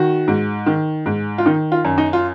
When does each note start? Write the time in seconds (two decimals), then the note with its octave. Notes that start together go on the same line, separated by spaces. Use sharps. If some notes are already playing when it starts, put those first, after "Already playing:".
Already playing: D#3 F#4
0.28 G#2
0.66 D#3
1.06 G#2
1.38 F4
1.46 D#3 D#4
1.72 F4
1.85 F#2
1.98 D#4
2.13 F4